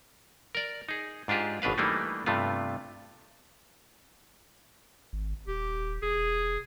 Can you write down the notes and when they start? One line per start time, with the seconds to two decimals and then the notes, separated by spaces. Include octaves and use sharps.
0.55 A#4 D5
0.89 D#4 G#4
1.28 G#2 D4 F4 G4 G#4
1.62 G#1 B2 D4 B4 F5
1.78 E3 G3 A3 A#3 D4 D#4
2.26 G2 C3 A3 B3 F4
5.13 G#1
5.47 D#1 G4
6.03 E1 G#4